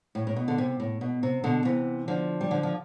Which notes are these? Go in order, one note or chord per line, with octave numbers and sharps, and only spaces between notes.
A2
A2
B2
D3
C3
A2
B2
C3
B2 D3
C3 E3
D3 F3
G3
D3 F3
F3